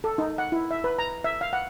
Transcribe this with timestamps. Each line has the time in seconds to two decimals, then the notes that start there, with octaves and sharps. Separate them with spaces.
0.04 A4
0.18 D#4
0.38 F#5
0.52 E4
0.71 E5
0.84 B4
0.99 A#5
1.24 E5
1.41 F5
1.53 F#5